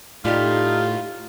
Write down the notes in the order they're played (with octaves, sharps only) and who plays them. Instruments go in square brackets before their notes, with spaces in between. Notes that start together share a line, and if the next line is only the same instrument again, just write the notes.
[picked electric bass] A2 [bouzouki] G3 G4 F5 [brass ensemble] A3 D#4 [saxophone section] F4